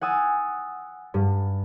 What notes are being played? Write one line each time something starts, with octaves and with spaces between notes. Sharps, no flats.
F#5 G#5 D#6 E6 A6
G2